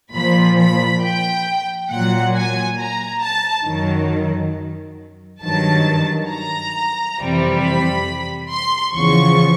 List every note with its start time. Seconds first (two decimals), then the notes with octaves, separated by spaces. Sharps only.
0.14 A#2 F3 B5
0.59 B5
1.02 G5
1.91 A#2 F#3 F#5
2.35 G#5
2.79 A#5
3.23 A5
3.66 F#2 D#3 F#3
5.42 G2 D#3 F#3 A5
6.31 A#5
7.19 F2 C3 E3 G3
7.63 B5
8.51 C6
8.94 E2 C#3 F3 C#6